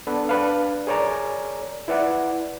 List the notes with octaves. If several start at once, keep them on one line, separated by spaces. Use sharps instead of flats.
B3 D4 A4 B4
D4 B4 F5
G#4 A#4 C#5 D5 G#5 A#5
E4 B4 D5 F#5